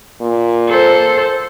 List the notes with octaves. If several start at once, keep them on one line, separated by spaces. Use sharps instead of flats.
A#2
A4 C5